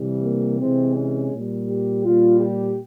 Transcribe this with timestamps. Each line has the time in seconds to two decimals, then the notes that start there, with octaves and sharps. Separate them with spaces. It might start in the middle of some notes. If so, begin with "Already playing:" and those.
Already playing: C3 E3 G3
0.23 A#3
0.59 C3 E3 G#3 C4
0.96 C#4
1.32 A#2 G3
1.68 G4
2.04 A#2 G3 F4
2.40 G4